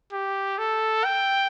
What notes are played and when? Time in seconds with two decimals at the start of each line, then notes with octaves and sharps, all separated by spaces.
0.12 G4
0.58 A4
1.05 G5